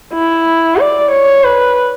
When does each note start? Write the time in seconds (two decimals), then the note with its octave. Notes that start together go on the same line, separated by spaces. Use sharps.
0.14 E4
0.78 D5
1.11 C#5
1.44 B4